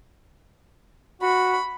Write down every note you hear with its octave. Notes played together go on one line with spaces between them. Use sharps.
F#4 B5